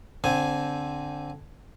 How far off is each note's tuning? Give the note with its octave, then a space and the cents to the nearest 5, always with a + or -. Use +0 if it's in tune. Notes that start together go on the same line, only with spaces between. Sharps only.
D3 -15 C4 +0 G#5 +0